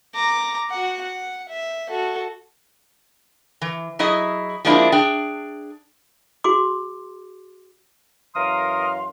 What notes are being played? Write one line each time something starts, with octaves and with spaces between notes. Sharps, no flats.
A#5 D6
F#4 F#5
F#5
E5
F#4 A4
E3
F#3 E4 G#4 D#5
F3 G#3 A#3 C4 D4 E4
D4 G#4 G5
F#4 G#4 C6 D6
F#2 E3 A#4 F5 C6 D#6